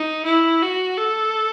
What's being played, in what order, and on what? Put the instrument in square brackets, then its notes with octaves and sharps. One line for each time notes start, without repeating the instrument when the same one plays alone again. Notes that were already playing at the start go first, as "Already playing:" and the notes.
Already playing: [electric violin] D#4
E4
F#4
A4